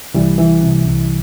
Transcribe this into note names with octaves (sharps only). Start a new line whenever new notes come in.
C2 E3 G3
E3
C3
C2